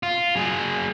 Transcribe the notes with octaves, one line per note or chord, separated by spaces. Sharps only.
F4
F#3 G#4